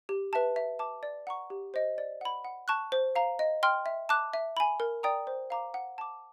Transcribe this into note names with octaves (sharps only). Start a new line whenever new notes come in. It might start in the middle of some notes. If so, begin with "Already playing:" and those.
G4
B4 E5 A5
E5
A5 D6
D5
F#5 A#5 C#6
G4
C5 D#5
D5
F#5 B5
F#5
A5 C#6 F#6
C5
F5 A#5
D#5
G5 C6 F6
E5
A5 D6 F#6
E5
G#5 B5
A#4
D5 G5 A#5 D#6
C5
F5 A#5 D6
F#5
A5 D6